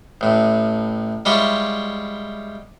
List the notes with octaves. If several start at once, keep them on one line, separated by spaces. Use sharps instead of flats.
A1 A2
G3 G#3 E4 F4 G4 C#5